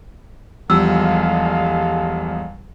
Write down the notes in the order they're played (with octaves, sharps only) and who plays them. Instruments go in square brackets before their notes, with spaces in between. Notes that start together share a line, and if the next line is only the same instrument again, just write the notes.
[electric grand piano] E2 F3 G3 [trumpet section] G#3 A4 F5 [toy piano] E6